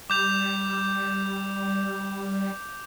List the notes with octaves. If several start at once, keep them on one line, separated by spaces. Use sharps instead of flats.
G3 D6 G6 F7